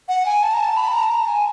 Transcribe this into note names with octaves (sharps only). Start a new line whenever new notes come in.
F#5
G#5
A5
A#5
A5
B5
A5
A#5
A5
A#5
G#5